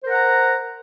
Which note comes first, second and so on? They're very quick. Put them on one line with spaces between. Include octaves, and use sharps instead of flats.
C5 A#4 F#5 A#5